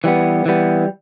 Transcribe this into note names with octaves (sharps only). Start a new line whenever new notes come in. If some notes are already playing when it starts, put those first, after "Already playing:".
E3 G3 B3
E3 G3 B3